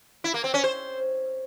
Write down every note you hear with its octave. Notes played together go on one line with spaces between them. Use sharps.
E4
A#3
C4
C#4
C5